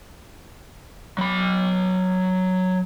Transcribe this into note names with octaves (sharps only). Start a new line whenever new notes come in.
F#3 B5